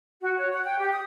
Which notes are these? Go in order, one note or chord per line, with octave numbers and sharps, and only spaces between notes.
F#4
C#5
F#5
G5
G4
D#6